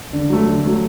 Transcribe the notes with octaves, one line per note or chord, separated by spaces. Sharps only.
D3
F#3 A3
D3
F#3 A3